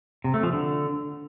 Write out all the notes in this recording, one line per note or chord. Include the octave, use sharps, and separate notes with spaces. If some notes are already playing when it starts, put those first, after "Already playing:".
C3
A3
F3
D3